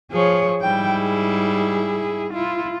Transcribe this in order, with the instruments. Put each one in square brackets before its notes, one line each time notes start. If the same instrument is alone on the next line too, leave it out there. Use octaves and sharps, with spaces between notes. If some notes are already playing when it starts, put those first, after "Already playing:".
[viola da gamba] F3 [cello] G#4 C#5
[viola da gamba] G#2 G3 E4 [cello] G5
[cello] G#4
[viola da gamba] E4 [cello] F4